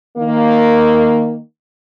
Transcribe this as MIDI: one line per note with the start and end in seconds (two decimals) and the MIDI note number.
0.17 1.39 51
0.17 1.39 58